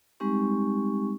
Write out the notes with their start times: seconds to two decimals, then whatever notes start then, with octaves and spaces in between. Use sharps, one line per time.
0.20 G3 G#3 C4 D#4 G4 C#6